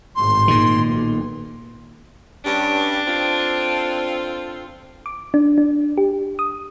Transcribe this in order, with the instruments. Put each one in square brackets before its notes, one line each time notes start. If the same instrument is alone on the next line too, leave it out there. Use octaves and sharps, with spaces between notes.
[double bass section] G#1 A2 [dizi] C6
[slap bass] A#2 D#3
[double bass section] B1
[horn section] G2 C#4 G4 [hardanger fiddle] D4
[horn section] C4 F4 A4
[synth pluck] D6
D4
D4
G4
D#6